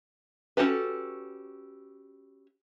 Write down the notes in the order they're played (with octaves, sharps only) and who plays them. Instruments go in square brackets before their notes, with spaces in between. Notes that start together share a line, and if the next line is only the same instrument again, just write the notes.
[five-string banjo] C#4 F#4 G4 A4 B4